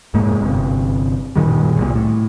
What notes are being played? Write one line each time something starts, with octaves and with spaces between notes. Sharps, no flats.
F1 G#2 G#3 A#3
G1 C3
F#1 A#2 D#3 G3
C2 A#2
A2